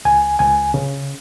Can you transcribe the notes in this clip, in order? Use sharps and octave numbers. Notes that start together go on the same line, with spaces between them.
C#2 G#5
C#2 G#5
C#3